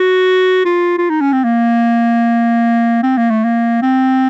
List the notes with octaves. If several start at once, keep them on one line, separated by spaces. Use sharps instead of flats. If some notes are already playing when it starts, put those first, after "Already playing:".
Already playing: F#4
F4
F4
D#4
C#4
C4
A#3
C4
A#3
A3
A#3
C4